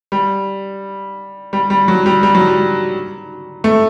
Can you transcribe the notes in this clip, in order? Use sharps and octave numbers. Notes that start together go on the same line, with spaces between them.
G3
G3
G3
F#3
G3
G3
F#3
G3
A3